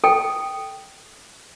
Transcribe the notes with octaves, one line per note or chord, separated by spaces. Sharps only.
A4 G5